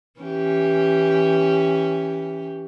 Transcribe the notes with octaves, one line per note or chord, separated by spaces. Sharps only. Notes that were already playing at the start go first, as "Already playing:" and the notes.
E3 C#4 G4